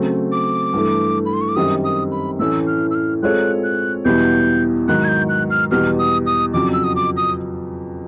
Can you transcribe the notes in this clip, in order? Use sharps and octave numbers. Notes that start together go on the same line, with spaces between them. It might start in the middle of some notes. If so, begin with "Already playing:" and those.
Already playing: C#3 F#3 A3 C4
D6
G2 E3 A3
B5
C6
C#6
D6
F#2 D#3 G3 C4 D#6
D#6
B5
A2 E3 A3 C#4 E6
F6
E6
F6
G#3 C4 F4 A4 C#5 F#6
F#6
E2 B2 G3 B3 E4 G6
G#2 D#3 F#3 F#6
G#6
G6
F#6
F6
E2 B2 G3 F6
D#6
D#6
F2 C#3 F#3 D6
E6
D#6
D6
D#6